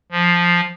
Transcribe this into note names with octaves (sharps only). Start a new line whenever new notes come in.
F3